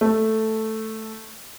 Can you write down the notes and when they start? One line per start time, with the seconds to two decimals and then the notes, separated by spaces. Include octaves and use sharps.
0.01 A3